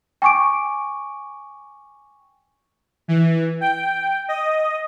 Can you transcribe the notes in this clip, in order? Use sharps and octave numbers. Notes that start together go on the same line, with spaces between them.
G5 G#5 C#6 D6 D7
E3
G5
D#5